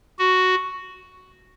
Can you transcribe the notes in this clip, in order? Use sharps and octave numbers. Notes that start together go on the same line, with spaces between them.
F#4